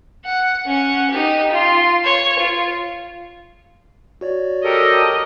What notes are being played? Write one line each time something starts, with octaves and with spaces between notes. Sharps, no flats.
F#5
C#4 F#5
D#4 G4
F4 C6
C#5
F4
F#4 C#5 D5
G4 A4 A#4 D#5